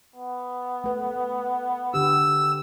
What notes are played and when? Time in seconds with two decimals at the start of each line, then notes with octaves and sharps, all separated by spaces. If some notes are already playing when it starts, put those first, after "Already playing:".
0.16 B3
0.84 A3 B4
1.94 D3 G4 E6